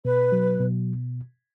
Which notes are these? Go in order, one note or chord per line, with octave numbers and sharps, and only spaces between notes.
B2 B4
F#3
B2